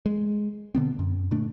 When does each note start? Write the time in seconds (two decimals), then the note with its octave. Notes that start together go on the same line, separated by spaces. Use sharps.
0.06 G#3
0.75 B2 D3 B3 C4
0.99 F#2
1.31 A#2 D3 A3 D4